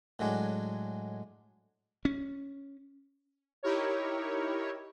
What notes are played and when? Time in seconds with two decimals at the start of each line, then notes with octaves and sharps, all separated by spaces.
0.19 A2 F#3 G#3 D4
2.05 C#4
3.63 D#4 E4 G4 A#4 C#5